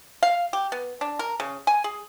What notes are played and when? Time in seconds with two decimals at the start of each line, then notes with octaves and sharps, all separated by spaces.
0.23 F5
0.53 G4
0.72 B3
1.01 D4
1.19 A#4
1.40 C#3
1.67 G#5
1.84 G#4